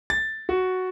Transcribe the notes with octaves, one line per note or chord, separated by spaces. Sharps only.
A6
F#4